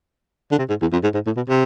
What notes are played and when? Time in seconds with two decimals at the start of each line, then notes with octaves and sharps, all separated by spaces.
0.52 D3
0.58 C3
0.69 G#2
0.81 E2
0.93 F2
1.03 G#2
1.14 G#2
1.26 A2
1.36 B2
1.49 C3